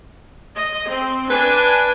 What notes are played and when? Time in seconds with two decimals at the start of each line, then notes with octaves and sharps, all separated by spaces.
0.57 D#5
0.87 C4
1.30 D4 B4 G#5